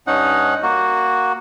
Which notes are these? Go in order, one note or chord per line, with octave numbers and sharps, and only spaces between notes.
G2 C#4 D#4 F#5
A#3 F#4